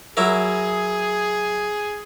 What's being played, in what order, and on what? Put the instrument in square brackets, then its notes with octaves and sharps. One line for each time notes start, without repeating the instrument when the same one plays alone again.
[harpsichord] F#3 E4 A#4 [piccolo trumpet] G#4